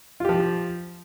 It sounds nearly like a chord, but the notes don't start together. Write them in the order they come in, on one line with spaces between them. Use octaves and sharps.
F4 G4 F3